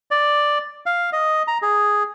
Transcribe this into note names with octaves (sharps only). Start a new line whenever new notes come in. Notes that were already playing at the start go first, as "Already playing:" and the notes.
D5
F5
D#5
A#5
G#4